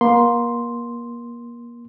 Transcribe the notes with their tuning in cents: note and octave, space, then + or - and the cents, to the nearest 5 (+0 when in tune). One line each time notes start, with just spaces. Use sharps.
A#3 +30 C6 +0